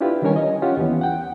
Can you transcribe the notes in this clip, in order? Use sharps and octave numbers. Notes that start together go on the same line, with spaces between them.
D4 E4 F4 G4 B4
D#3 G3 C#4 A#4 C#5 G#5
D#5
C#4 F4 G4 C#5 F#5
D#2 E3 B3
F#5 G5